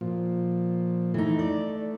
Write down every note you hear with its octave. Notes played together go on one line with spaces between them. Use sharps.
A#2 F3
E3 A3 D#4
D5